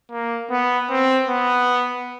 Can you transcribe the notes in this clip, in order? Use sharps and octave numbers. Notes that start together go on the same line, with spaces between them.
A#3
B3
C4
B3